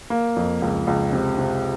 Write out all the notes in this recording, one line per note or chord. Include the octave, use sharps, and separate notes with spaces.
A#3
F2
C#2
C#2
C3
C3